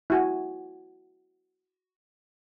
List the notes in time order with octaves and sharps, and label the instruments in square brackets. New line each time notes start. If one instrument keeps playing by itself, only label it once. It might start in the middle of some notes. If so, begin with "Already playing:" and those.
[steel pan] E4 F#4 G#5